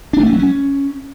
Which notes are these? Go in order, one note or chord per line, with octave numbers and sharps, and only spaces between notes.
D4
A3
C#4
F#3
C#4